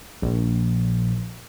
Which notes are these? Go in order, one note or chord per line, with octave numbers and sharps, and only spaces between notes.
A#1